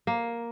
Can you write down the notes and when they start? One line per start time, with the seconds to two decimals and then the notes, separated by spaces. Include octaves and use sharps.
0.07 A#3